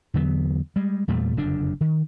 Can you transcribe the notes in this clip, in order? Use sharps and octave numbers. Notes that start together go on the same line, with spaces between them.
E2 D3 F#3 B3
G3 G#3
E2 A#2 G3 A3
F#1 F2 D3 D4
D#3